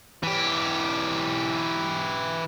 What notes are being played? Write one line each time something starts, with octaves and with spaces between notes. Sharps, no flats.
E3 G4